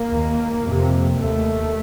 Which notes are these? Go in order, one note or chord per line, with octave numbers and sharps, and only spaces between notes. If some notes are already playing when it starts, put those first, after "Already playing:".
Already playing: A#3
D#2
F2 C3
D#2 A3